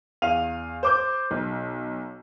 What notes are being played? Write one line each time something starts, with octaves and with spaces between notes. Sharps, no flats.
E2 F5 D#7 F7
C5 D6 G6
B1